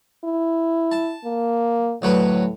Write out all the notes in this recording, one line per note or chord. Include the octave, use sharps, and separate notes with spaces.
E4
A5
A#3
D2 A2 F#3 B4